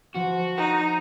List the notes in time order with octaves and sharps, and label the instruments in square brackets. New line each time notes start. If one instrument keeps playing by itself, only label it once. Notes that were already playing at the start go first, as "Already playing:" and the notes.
[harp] F3 [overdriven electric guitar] F#4
[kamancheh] D#4